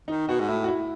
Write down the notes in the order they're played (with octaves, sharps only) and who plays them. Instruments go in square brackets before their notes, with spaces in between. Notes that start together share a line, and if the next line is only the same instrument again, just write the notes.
[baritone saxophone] D#3 [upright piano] D#4
[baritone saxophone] B2 [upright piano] F#4
[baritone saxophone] G#2
[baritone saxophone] A2 [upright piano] E4
[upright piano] F#4
E4